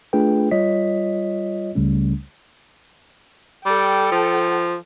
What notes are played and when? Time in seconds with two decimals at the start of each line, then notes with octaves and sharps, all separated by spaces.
0.13 A3 D4 F4 G#4 B4 G5
0.51 G3 F4 C#5 D#5 B6
1.75 C#2 C#3 G3 A3 C#4
3.66 G3 A4 G5
4.12 F3